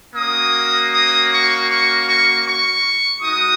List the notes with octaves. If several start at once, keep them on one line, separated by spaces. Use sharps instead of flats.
A#3 C#4 F#4 D#6
D#6
C#6
C#6
C#6
C#6
G#3 D#4 F#4 D#6